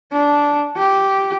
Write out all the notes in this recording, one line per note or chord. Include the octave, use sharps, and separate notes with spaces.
D4
G4